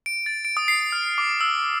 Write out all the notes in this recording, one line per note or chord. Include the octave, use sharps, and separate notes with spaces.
D7
A6
D7
D#6
C7
F6
D6
E6